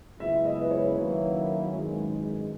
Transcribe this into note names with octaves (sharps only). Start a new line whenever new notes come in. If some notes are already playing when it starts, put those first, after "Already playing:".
F#2 C#3 G#3 B3 E4 E5
D#5
B4
C#5
D#3 F#3 A#3 C#4 E4 B4
G#1 F#2 D#3 G#3